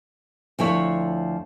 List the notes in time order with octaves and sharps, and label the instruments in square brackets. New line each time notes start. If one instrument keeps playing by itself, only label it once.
[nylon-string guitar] D2 F3 E4 C#5